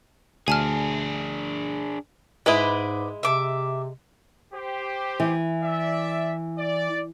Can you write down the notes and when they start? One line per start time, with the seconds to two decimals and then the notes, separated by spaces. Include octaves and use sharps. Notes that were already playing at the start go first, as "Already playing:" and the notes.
0.48 D2 D4 G#4 G#5 A5 F6
2.46 G#2 G#3 E4 B4 D5 D#5
3.23 C3 E5 D6
4.53 G4 C5
5.20 E3
5.63 D5 E5
6.57 D5